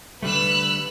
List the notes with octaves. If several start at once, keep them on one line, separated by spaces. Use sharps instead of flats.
D3 G3 A3 B4 E6 F#6